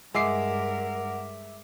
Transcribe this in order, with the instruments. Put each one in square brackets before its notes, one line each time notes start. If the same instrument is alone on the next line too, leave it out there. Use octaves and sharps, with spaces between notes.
[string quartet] G2 A#4 [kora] G#3 [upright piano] E5 D6 C7 [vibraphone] F#5